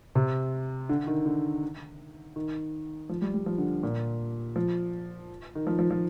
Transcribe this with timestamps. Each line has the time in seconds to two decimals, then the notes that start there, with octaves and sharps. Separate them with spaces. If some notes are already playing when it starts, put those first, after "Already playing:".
0.15 C3
0.89 D3
1.07 D#3
1.26 D3
2.36 D#3
3.09 F3
3.22 G3
3.34 G3
3.46 F3
3.58 D3
3.83 A#2
4.56 F3
5.55 D#3
5.67 F3
5.79 F3
5.90 F3